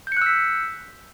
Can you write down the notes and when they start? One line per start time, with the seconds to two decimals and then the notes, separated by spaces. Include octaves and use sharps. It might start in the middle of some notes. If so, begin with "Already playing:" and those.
0.07 G6
0.12 C#7
0.17 F#6
0.21 E6
0.26 B6